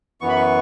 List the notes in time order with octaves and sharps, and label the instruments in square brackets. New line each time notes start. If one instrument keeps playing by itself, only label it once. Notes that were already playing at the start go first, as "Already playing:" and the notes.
[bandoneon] F#2 E3 B3 C#6
B5
C#6